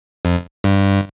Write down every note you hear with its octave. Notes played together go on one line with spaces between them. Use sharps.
F2
G2